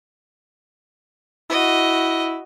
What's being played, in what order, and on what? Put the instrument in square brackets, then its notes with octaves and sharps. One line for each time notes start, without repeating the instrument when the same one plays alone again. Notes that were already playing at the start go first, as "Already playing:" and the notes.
[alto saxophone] E4 [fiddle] F#4 D#5